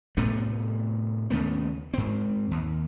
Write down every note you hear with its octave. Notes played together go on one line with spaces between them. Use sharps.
A2 C3 A3 B3
D#2 C#3 A3 B3
G#2 C4
D#2